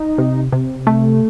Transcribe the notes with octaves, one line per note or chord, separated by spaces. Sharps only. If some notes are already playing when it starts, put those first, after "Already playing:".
Already playing: D#4
C3
C3
A3